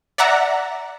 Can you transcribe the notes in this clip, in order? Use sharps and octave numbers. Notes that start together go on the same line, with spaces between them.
D5 E5 F#5 A#5